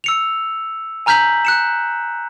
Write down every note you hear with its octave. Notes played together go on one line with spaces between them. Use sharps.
E6 C#7 F7
G#5 A#5 F6 G6 B6 F#7
F#6 C#7 E7